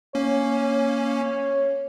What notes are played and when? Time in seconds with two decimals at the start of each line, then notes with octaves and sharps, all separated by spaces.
0.15 A#3 C#4 C#5